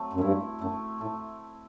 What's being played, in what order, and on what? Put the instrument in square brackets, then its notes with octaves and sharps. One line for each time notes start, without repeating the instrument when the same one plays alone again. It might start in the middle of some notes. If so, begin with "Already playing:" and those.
Already playing: [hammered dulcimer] F#3 A3 C4
[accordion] F#2
[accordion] G2 [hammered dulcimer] E4
[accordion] F#2 [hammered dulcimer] A3
[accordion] A2 [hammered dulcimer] A3